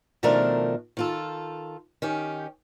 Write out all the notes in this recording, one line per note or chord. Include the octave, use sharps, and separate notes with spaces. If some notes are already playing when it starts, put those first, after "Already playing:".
B2 D#3 F3 A3 D4 A#4
D#3 F4 A4
D#3 C#4 G4